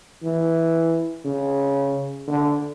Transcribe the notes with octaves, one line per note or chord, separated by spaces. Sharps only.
E3
C#3
D3